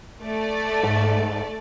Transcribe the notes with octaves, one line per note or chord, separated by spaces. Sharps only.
A3 D5
G#2